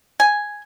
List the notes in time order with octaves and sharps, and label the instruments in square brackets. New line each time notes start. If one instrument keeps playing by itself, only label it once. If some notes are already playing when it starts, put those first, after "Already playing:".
[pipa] G#5